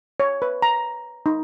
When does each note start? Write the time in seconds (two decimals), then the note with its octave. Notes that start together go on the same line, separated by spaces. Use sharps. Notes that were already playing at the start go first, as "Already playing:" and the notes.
0.20 C#5
0.42 B4
0.62 A#5
1.26 D#4